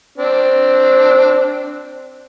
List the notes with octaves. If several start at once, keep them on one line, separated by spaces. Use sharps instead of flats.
C4 D4